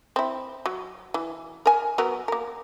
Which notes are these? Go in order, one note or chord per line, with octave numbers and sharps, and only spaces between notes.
C4 E4
F#3
E3
A#4 G#5
F#3 B3 A#4
A#3 A#4